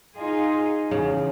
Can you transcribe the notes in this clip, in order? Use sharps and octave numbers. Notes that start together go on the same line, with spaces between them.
D#4 F4 G#4
E2 C#3